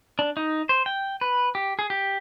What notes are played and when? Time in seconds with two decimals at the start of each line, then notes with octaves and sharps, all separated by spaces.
0.19 D4
0.37 D#4
0.69 C5
0.86 G5
1.21 B4
1.55 G4
1.79 G#4
1.90 G4